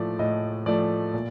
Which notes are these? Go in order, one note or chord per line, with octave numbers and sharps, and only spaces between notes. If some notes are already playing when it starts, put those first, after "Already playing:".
Already playing: A2 F3 A3 D5
A2 D#5
F3 A3 D5
A#2